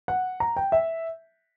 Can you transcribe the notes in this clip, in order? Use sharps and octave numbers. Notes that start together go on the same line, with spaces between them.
F#5
A#5
G5
E5